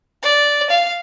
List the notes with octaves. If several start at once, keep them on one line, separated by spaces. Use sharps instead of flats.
D5
F5